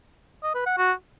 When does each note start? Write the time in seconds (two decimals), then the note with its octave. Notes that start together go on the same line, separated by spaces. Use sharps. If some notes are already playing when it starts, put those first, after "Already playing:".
0.43 D#5
0.55 B4
0.66 F#5
0.77 F#4